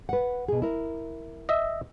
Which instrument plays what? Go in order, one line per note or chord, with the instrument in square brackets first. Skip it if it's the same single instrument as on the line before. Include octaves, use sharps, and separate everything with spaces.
[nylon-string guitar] B4 F#5
B2 G#4
E4 A#4
[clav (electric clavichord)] D#5 E5